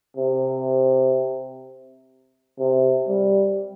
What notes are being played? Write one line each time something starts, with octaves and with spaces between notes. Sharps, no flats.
C3
C3
G3